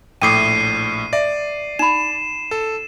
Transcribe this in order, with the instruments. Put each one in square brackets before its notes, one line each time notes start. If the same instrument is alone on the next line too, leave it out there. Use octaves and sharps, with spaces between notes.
[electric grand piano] A#1 A2 [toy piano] G5 D6 D#6 [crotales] C7 D#7
[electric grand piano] D5 [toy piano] E5
[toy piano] D#4 B5 [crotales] E7
[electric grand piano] A4